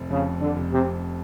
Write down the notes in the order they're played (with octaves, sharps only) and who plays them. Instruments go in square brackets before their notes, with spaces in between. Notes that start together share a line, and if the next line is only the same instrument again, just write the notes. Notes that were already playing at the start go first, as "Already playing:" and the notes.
Already playing: [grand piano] F1 C3
[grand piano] F2 [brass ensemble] C#3
[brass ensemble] D3
[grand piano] F1
[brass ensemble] C3